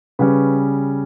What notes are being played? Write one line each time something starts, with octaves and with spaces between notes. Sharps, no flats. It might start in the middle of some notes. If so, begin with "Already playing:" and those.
C#3 G3 C#4 B4